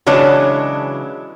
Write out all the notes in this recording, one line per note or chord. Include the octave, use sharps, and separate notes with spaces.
C#3 E3 F#3 G#3 D4